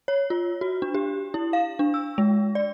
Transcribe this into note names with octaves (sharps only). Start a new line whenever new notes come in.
C#5
F4
F#4
D4
G4
E4
F5
D4
E6
G#3
D5